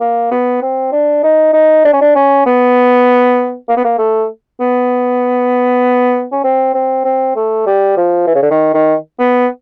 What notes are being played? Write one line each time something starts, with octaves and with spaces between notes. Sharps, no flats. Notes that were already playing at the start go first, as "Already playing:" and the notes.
A#3
B3
C4
D4
D#4
D#4
D4
C#4
D4
C#4
B3
A#3
B3
A#3
A3
B3
C#4
C4
C4
C4
A3
G3
F3
E3
C#3
D3
D#3
D#3
B3